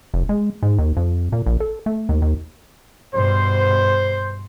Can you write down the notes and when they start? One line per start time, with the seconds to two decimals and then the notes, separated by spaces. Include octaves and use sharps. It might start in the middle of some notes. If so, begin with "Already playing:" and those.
0.14 F1
0.29 G#3
0.63 G#2
0.79 D#2
0.97 F2
1.32 A#2
1.46 A#1
1.60 A4
1.86 A3
2.09 D#2
2.22 D#2
3.14 G2 B2 C5